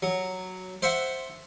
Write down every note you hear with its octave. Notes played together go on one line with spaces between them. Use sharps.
F#3
C5 E5 F#5